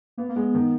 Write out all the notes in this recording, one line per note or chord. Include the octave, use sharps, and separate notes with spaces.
A#3 B3
A#3
G#3 B3
D#3